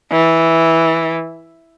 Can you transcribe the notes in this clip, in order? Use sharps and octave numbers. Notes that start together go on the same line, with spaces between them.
E3